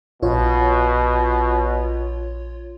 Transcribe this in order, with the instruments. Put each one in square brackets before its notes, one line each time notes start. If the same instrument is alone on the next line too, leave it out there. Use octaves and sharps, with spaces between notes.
[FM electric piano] A#1 F4 C#5 [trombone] B2